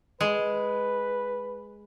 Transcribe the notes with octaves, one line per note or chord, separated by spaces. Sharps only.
G#3 B4